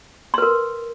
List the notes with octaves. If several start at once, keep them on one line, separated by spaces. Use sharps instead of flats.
A#4 B4 C6